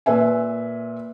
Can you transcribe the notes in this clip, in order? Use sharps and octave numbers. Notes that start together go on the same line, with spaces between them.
A#2 B4 E5 G#5